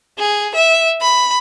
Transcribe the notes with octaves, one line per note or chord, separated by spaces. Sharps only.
G#4
E5
B5